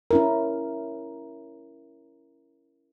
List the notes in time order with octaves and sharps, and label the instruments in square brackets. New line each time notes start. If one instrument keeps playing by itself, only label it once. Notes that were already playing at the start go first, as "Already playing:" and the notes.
[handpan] C#4 E4 A#4